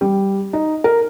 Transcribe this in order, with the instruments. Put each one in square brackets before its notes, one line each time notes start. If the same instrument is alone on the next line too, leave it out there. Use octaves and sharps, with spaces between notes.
[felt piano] G3
D#4
A#4